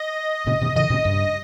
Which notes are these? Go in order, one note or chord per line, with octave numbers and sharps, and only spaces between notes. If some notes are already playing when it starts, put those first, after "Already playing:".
Already playing: D#5
A#2 C#3
B2 D#3
C#3 E3 D#5
A#2 C#3
G2